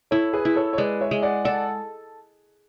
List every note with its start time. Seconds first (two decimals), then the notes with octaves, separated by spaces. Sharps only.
0.11 E4 A4 C#5
0.33 G#4 B4
0.45 E4
0.56 A4 C#5
0.73 C#5
0.78 G#3 B4 D5
1.01 C#5 E5
1.11 G#3
1.23 D5 F#5
1.45 A4 D5 F#5